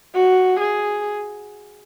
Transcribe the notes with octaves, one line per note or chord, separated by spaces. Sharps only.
F#4
G#4